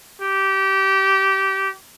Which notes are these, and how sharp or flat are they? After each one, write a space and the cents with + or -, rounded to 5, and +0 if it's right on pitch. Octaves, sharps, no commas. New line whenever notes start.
G4 -20